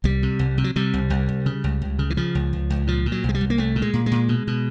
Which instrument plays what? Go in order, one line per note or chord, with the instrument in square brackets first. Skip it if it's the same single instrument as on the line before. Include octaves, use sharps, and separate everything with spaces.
[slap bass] C2 G3
C3
C2
C3
F#3
C3 G3
C2
C2
C2
C#3
C#2
C#2
C#3
E3
C#3 F3
C#2
C#2
C#2
A#2 F3
A#2
F#3
C2
G#3
G3
C2
A#3
C2 A3
A#2
G#3
A#2
G#3
A#2
B2
B2